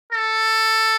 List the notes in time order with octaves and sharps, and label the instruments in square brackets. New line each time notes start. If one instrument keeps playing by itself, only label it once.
[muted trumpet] A4